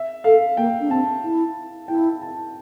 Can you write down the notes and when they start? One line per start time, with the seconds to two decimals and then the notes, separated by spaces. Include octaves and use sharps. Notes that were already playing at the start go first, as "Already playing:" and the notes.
Already playing: E5
0.24 A4 F5
0.57 A#3 G5
0.80 D4
0.90 C4 A5
1.23 E4
1.88 E4 G5
2.22 A5